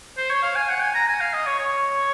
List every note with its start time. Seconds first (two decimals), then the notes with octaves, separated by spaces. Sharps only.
0.17 C5
0.30 C#5
0.43 F5
0.56 G#5
0.69 F#5
0.82 G#5
0.95 A#5
1.08 G#5
1.20 F5
1.33 D#5
1.47 C#5
1.59 C#5